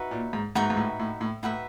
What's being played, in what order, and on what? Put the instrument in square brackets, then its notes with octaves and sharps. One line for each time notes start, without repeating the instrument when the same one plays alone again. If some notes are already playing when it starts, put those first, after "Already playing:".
Already playing: [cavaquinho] D#4 F#4 B4 E5
[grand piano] A#2
G#2
[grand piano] G#2 [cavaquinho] D#4 F#4 B4 E5
[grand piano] G#2
A2
A2
A2
[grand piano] A2 [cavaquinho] D#4 F#4 B4 E5